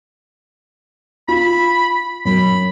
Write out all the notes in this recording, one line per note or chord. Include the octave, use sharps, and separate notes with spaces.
F4 B5
F#2 B5